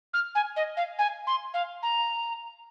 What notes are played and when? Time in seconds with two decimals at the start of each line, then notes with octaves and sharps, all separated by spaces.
0.13 F6
0.35 G#5
0.56 D#5
0.77 F5
0.98 G#5
1.27 C6
1.54 F5
1.83 A#5